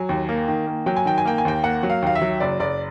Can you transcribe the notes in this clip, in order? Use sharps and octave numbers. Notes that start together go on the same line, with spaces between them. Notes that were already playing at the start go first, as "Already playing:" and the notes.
Already playing: F#3 G#5
D#2
A#3
D#3
A#3
F#3 G5
G#5
D#3 G5
G#5
A#3 G5
G#5
D#2 G5
A#3 F#5
F#3
F5
D#2 F5
E5
F#3
F#1 D5
F#1 D5